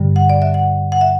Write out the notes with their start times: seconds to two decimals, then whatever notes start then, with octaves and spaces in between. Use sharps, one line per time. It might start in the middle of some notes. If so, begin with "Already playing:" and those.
Already playing: G2 D3 G3
0.16 F#5
0.30 D5
0.42 E5
0.54 F#5
0.92 F#5
1.01 E5